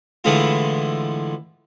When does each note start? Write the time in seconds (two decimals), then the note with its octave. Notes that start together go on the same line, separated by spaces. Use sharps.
0.24 A2 D3 E3 G#3 A3 F4